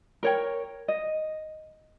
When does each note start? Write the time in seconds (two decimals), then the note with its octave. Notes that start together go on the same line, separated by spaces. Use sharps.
0.23 A#4 C#5 G5
0.88 D#5